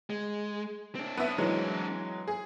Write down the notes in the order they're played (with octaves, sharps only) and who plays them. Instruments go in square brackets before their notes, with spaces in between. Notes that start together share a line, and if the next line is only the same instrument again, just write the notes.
[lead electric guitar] G#3
C4 D4
[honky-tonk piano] B3 E5
E3 F#3 G#3
G#4